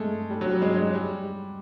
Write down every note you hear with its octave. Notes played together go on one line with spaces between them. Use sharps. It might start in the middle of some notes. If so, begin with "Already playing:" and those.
Already playing: G#3 A3
G3
F#3
G3
G#3
G#3
G3